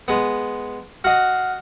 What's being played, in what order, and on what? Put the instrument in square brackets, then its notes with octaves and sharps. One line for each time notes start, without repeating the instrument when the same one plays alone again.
[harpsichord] G#3 B3
[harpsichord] F#4 D#5 [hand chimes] F#5 F6